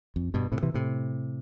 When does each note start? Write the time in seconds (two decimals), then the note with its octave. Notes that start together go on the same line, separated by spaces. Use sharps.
0.16 F2
0.34 G2 B2
0.52 A2 C3
0.63 C3 E3
0.74 A2 C3